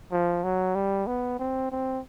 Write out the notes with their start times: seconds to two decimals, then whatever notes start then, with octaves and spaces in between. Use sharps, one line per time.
0.12 F3
0.43 F#3
0.75 G3
1.07 B3
1.39 C4
1.71 C4